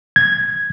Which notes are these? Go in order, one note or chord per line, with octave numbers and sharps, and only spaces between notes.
G#6